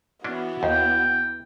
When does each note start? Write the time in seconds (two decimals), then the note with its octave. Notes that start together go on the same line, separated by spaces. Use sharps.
0.24 E3 B3 C#4 D4 F#4
0.63 D#2 G5